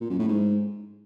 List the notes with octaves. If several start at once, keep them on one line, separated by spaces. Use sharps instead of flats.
A#2
F#2
A2
G#2